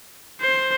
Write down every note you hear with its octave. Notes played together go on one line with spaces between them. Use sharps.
C5